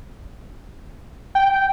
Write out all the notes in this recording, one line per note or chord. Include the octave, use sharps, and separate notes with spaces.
G5